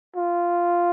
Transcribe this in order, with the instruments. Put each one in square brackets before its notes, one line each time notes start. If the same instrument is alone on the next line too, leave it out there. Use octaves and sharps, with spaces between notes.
[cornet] F4